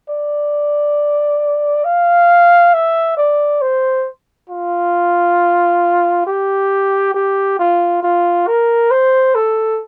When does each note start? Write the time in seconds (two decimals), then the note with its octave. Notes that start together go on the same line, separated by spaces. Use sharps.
0.09 D5
1.85 F5
2.73 E5
3.18 D5
3.62 C5
4.50 F4
6.27 G4
7.15 G4
7.59 F4
8.03 F4
8.47 A#4
8.91 C5
9.35 A4